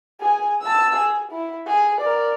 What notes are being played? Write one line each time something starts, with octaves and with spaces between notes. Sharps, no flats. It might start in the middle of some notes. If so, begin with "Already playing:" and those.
G#4 G#5
A5 E6
G#4
E4
G#4
A#4 D5